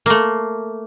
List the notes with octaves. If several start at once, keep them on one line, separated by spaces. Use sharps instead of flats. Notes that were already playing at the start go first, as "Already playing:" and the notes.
A3 A#3